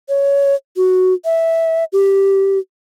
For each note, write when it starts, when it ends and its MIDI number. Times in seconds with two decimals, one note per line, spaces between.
0.09 0.55 73
0.77 1.14 66
1.25 1.84 76
1.93 2.59 67